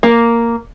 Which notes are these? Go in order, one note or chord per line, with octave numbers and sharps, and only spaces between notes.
A#3